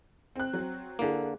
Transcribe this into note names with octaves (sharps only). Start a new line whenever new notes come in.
C4 F#6
F#3 C4
D3 A#3 E4 G#4